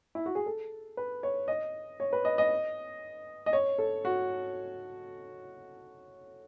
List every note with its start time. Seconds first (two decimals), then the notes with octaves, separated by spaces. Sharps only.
0.15 E4
0.26 F#4
0.35 G#4
0.46 A4
0.97 B4
1.23 C#5
1.48 D#5
2.00 C#5
2.13 B4
2.25 D#5
2.38 D#5
3.46 D#5
3.53 C#5
3.78 A4
4.05 F#4